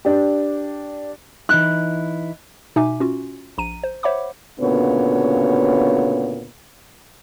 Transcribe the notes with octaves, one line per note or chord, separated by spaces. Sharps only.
D4 G4
E3 D#4 E4 F#6
B2 D#4 E5 G#5 D6
C#4 F4 F#4
A#1 A#5 D#7
C5
C5 C#5 E5 F#5 B5 D6
D2 A#2 C#3 B3 C#5